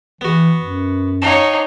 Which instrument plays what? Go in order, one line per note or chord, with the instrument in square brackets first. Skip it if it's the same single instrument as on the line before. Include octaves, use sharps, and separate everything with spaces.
[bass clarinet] E3 [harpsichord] B3 F#4
[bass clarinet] F#2
[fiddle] D#4 C#5 [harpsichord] F5 G5 A5